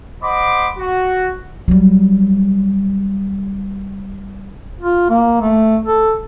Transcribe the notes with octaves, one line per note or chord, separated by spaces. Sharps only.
C5 D#5 F#5 B5 C6 D6
F#4
F#3 G3
F4
A#3
A3
A4